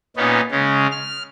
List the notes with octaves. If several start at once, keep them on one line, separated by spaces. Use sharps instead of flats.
A#2 B3 C#4 D#4
C#3 G#3 C#4
F6